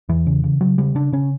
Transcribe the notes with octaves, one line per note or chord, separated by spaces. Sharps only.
E2 E3
C#3
C#3
C#3 F#3
C#3 G3
C#3 D4
C#3 C#4